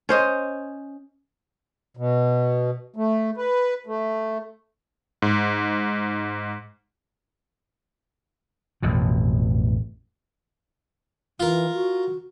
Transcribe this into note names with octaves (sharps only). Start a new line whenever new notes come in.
C#4 C5 D#5
B2
A3
B4
A3
G#2
A1 F2 B2
E3 F4 A#4
F#4